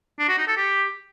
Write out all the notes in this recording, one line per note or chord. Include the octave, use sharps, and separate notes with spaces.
D4
F#4
D#4
A4
G4